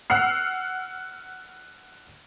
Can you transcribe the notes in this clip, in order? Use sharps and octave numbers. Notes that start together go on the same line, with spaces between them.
F#5 E6 F6 C7